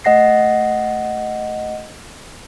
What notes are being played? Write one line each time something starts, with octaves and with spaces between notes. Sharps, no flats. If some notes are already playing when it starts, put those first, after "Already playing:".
A3 D#5 F#5 A#6 C7